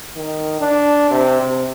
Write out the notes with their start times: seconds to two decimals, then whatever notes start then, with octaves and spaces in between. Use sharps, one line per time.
0.16 D#3
0.61 D4
1.11 C3
1.43 C3